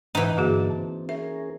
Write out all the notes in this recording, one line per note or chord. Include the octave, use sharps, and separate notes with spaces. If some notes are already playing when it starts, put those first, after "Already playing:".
G#2 E3 D#4 F#5
G2 D3 A#3 F#4 G#4 A5
C4
C#4 G#4 A#4 E5